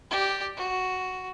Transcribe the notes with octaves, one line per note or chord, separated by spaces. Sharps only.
G4 D5
F#4